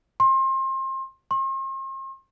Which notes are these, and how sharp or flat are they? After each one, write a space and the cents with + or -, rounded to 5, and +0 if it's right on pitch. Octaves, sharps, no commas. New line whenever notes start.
C6 +30
C6 +45